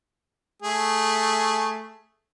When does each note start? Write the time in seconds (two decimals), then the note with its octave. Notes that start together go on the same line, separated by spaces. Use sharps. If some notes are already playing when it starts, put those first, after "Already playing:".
0.62 A3 G#4